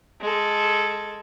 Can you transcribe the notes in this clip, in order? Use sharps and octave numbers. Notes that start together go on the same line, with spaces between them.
G#3 A4